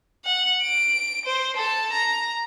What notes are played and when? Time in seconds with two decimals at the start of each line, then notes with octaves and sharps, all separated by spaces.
0.25 F#5
0.63 D7
1.25 C5
1.56 A4 A5
1.92 A#5